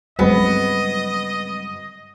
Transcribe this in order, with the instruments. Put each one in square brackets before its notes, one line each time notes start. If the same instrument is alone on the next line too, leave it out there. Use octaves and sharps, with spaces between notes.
[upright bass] G2 C#3 [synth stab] F#3 G#3 C4 [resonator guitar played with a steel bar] B3 [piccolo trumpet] D#5